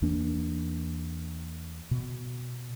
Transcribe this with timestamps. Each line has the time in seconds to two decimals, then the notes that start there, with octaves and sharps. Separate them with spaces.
0.02 E2 E3 A#3 D4
1.91 B2